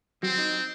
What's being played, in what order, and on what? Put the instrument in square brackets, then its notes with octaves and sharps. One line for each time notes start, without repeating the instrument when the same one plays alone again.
[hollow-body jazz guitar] F#3 [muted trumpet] C4
[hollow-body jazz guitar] D#4